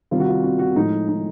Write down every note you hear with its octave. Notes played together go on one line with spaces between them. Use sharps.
C3 D#3 G3 F4
F#4
F4
F#4
F#4
A2 F3 G#3 D#4
D#4